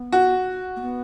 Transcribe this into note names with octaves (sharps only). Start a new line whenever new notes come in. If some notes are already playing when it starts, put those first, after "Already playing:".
Already playing: B3
F#4
A#3
B3